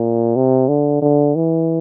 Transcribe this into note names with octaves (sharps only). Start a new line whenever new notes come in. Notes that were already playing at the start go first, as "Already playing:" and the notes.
Already playing: A#2
C3
D3
D3
E3